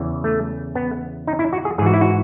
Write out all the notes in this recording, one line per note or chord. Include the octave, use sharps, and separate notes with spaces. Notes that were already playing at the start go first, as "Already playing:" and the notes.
Already playing: E2 C#3 E3
A3
B3
D#4
E4
F#4
G#4
G#2 E3 F#4 G#4
E4
F#4